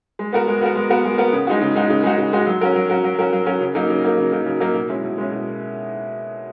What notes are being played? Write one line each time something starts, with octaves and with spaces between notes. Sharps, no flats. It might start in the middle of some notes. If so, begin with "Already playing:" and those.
G#3
B3 F#4 A#4
G#3
B3 F#4 A#4
G#3
B3 F#4 A#4
G#3
B3 F#4 A#4
C#3
G#3 D#4 F#4
C#3
G#3 D#4 F#4
C#3
G#3 D#4 F#4
C#3
G#3 D#4 F#4
F#3
C#4 F#4 A#4
F#3
C#4 F#4 A#4
F#3
C#4 F#4 A#4
F#3
C#4 F#4 A#4
C#3
F#3 A#3 D#4 A#4
C#3
F#3 A#3 D#4 A#4
C#3
F#3 A#3 D#4 A#4
C#3
F#3 A#3 D#4 A#4
B2
G#3 C#4 E4
B2
G#3 C#4 E4
B2